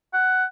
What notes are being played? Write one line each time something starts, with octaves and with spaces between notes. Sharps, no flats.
F#5